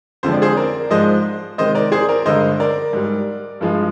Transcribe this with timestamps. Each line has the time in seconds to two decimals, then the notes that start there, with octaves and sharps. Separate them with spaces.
0.23 F2 D3 F3 G#3 C5
0.32 D5
0.42 G#4 C5
0.57 A#4 D5
0.91 G#2 F3 G#3 C5 D#5
1.58 C3 D#3 G#3 C5 D#5
1.75 A#4 D5
1.92 G#4 C5
2.09 A#4 D5
2.26 G2 D3 G#3 C5 D#5
2.60 A#4 D5
2.93 G#2 G3
3.61 G2 F3 G#3